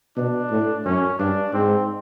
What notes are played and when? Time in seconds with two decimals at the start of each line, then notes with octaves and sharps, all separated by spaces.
0.17 B2 D4
0.51 A2
0.85 F#2 C#4
1.19 G2 D4
1.54 G#2 C4